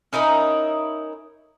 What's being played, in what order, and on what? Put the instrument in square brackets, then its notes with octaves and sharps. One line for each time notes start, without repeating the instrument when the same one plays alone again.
[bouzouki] C#4 D#4 E4 A#4